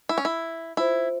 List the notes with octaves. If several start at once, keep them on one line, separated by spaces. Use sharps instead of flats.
E4
C#4
E4
E4 F4 C5 E5